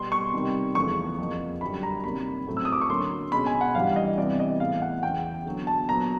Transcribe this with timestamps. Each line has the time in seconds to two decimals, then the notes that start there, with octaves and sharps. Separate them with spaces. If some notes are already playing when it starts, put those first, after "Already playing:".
Already playing: B2 G3 B3 C6
0.12 C#6
0.33 C3 D#3 G3
0.75 E2 C#3 F3 A3 C#6
1.18 F2 C#3 F3 A#3
1.61 F#2 D3 G3 B5
1.83 A#5
2.04 C3 D#3 G3 A#3 C#4 B5
2.47 A2 F#3 A3 C4
2.57 E6
2.65 D#6
2.72 D6
2.81 C#6
2.89 D3 F#3 A#3 C#4 C6
3.32 B2 G#3 C#4 B5
3.46 G#5
3.61 F#5
3.75 G2 E3 G3 F5
3.96 D#5
4.17 C3 E3 G3 B3 D5
4.39 D#5
4.60 A2 E3 G#3 B3 F5
4.82 F#5
5.03 E2 C#3 E3 G5
5.46 D3 F#3 B3
5.67 A5
5.88 A#2 F#3 B3 A#5